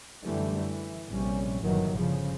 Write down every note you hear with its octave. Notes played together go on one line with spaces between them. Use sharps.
F#2 D3 E3 G3 A3
E3
A#1 C3 G3 C#4
G1 A#2 D#3 E3 F#3
G1 C#3 F3